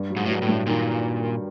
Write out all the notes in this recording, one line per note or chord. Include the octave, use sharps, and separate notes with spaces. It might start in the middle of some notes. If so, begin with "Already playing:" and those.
Already playing: G2
F#3
G#2
A2
G#2 F#3
A2
G2
A#2 D#3